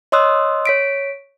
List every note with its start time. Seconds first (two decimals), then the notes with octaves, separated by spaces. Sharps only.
0.12 C#5 D#5 C6 D#6 E6 F#6
0.66 C#5 B6 D7